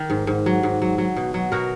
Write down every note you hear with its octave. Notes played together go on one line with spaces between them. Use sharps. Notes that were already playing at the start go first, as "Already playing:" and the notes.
Already playing: D#3
G#2
G#2
F#3
G#2
F#3
F#3
B2
F#3
B2 F#4 A#4